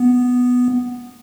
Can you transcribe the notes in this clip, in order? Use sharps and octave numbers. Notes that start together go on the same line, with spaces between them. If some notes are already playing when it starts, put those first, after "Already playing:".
Already playing: B3